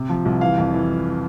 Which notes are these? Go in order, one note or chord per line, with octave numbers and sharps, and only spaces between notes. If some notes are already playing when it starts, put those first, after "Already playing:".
Already playing: C3
F3
C2
E3 F5
F2
E3